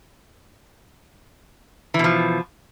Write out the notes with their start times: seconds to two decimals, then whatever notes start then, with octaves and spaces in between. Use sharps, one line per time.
1.94 E3
1.99 B2
2.04 F3